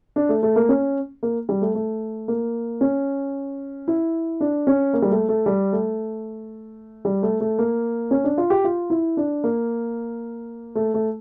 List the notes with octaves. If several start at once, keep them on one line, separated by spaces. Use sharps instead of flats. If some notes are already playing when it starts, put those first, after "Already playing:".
D4
A3
A3
A#3
C#4
A#3
G3
A3
A3
A#3
C#4
E4
D4
C#4
A#3
G3
A3
A3
G3
A3
G3
A3
A3
A#3
C#4
D4
F4
G4
F4
E4
D4
A#3
A3
A3